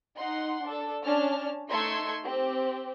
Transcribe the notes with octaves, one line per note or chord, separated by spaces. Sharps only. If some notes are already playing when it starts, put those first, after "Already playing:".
D#4 F#5 C6
D4 A4
C#4 D4 A5 F6
A3 D#4 C6 E6 G#6 C#7
C4 G4